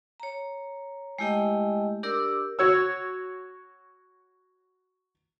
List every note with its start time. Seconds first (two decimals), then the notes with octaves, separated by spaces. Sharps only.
0.20 C#5 A#5
1.19 G#3 A3 E4 G4 D#5 G5
2.03 D4 G4 A#4 D5 D6 E6
2.59 F#4 C#5 E6